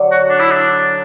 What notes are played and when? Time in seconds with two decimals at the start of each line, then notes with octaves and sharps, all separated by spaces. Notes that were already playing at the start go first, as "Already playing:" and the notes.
Already playing: D3 F#3
0.11 F#4
0.29 D4
0.40 E4
0.51 D4